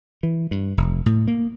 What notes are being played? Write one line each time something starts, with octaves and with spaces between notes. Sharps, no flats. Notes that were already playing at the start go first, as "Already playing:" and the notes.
E3
G2
F1
A2
A#3